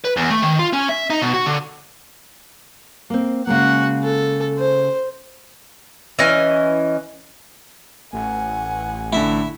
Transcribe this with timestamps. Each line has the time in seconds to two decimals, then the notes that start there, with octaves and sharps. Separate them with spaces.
0.04 B4
0.17 E2
0.30 A3
0.42 D#3
0.59 F4
0.73 C#4
0.89 E5
1.10 D#4
1.22 B2
1.34 F#4
1.46 D3
3.10 A#3 C4
3.47 C#3 G#3 A#3 F#4 F#5
4.04 A4
4.58 C5
6.19 E3 C#4 D#5 G#5
8.13 A1 F#5 G#5
9.13 A2 D3 E4 E5